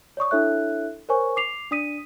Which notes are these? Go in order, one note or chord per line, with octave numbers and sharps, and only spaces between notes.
C#5 D5 C#6 D#6
D4 E4 A4 C#5 E5 F#6
A#4 C5 C#5 G#5 C#6
D6 C7 F7
D4 D5 D#6 B6 D#7